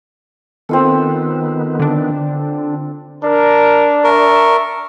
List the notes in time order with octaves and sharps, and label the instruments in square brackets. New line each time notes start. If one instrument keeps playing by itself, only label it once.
[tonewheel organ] D#3 B3 [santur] C4 F4 A4
[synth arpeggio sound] D3 D4
[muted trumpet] D4 [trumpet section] A#4
[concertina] A#4 [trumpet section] E5 A5 C#6